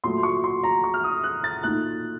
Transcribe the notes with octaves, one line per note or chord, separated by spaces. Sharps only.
A#2 F#3 A3 C6
C#6
C6
A#5
C#6
F6
D#6
F#6
A6
A#2 A3 D#4 F#6